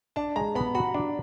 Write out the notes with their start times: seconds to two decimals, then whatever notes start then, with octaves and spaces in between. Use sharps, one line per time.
0.16 D4 A5
0.36 G#3 A#5
0.55 B3 B5
0.75 F#4 B5
0.94 D4